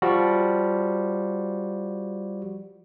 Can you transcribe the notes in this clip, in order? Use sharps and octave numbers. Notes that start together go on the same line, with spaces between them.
F3 G3 F#4